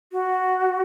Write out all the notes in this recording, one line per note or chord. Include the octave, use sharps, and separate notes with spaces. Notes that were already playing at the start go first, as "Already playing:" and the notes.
F#4